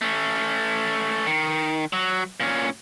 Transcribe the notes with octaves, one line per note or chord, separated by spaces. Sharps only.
A3 C#4
D#3
F#3
A#2 C#4